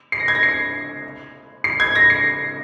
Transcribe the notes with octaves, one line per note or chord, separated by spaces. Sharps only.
C7
A#6
G#6
A#6
C7
C7
G#6
A#6
C7